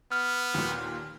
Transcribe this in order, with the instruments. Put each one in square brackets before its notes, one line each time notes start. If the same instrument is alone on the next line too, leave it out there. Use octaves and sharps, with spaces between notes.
[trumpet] B3 [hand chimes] F6
[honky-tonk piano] D#2 A#2